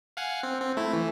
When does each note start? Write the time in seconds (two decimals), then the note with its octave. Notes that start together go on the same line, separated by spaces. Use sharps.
0.17 F5 F#5 G#5
0.43 C4
0.61 C4
0.77 A3 E4
0.93 E3